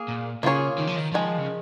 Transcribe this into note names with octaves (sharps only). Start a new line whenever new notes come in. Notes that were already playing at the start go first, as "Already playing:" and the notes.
Already playing: A#3 G#4
A#2
C#3 A#3 F4 G#4 C#5
D#3
F3
D#3
D#3 F3 G#3
C#3